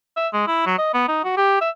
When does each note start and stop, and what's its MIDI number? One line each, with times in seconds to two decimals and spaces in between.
0.17 0.28 76
0.33 0.45 56
0.47 0.62 64
0.66 0.75 54
0.78 0.92 75
0.94 1.03 59
1.08 1.21 63
1.24 1.33 66
1.37 1.60 67
1.61 1.70 76